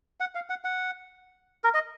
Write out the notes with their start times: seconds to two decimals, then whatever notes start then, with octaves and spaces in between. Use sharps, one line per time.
0.20 F#5
0.35 F5
0.50 F#5
0.64 F#5
1.64 A#4
1.74 D#5